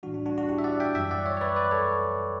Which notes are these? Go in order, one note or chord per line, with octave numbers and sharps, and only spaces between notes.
A2 E3 G3 D4 F#4
D4
D4 F#4
D4 F#4
E4 G4
E5
D5 F#5
E5 G5
F#2 E3 G3 E5 G5
D5 F#5
C#5 E5
C#5
B4 D5
B4 D5
A4 C#5